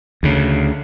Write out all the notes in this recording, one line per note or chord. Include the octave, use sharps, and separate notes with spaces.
D2 C#3